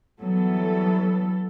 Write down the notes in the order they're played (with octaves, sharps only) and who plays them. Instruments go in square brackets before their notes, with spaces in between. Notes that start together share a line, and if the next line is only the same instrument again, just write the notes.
[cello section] E3 F#3 G3 B3 A4